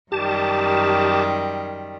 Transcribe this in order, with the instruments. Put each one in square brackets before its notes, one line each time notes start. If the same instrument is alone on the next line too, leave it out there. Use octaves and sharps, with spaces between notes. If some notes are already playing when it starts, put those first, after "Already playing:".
[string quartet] F#2 D#3 G3 [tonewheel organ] G4 A5